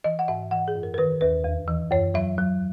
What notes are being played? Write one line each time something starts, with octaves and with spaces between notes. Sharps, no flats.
E3 D#5
F#5
G#2 E5
E3 F#5
G#4
F#2
A#4
A#4
D#3 B4
D#2 B4
E2
E3
F#2 C#5
F#3 E5
F#3